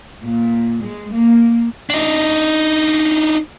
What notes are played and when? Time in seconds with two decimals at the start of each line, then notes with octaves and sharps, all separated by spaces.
0.22 A#2
0.83 G#3
1.13 A#3
1.90 D4 D#4